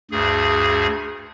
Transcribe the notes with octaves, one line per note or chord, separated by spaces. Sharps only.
D2 G2 G#4